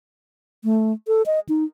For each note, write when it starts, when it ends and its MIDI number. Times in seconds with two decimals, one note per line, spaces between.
0.64 0.93 57
1.08 1.22 69
1.26 1.40 75
1.49 1.64 63